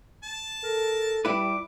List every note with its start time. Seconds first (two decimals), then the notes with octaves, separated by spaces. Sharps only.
0.23 A5
0.64 A4 A#4
1.25 G3 E4 B4 D6